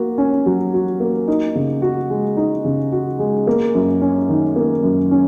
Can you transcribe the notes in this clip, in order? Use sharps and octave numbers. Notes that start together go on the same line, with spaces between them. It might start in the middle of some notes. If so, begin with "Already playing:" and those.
Already playing: A#3 F#4
C#4
F#3
F#4
A#3
D#4
C#3
F#4
G#3
D#4
C#3
F#4
G#3
A#3
F#2
C#4
D#3
A#3
F#2
C#4